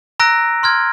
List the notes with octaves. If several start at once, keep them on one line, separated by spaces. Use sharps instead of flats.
A#5 E6 F#6 A#6 D7
C6 F6 G#6